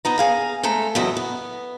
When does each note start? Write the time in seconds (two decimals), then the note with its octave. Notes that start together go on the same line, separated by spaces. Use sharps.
0.05 B3 D#4 A#5
0.18 G#4 F5 A#5
0.63 G#3 A3 A4 A#5
0.95 E2 C#3 F#3 D#5 E5
1.17 B3